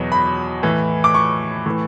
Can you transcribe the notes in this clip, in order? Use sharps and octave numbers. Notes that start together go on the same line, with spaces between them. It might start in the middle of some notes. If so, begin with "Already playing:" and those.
Already playing: E2 B2 F#3
B5
A2 E3
D6
C#6
A2 E3